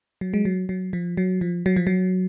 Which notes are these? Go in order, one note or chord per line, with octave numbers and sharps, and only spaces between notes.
F#3
G#3
F#3
F#3
F3
F#3
F3
F#3
F3
F#3